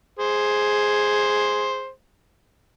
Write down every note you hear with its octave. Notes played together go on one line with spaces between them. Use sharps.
G#4 C5